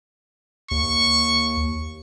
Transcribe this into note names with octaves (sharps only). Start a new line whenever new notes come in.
D#2 C#6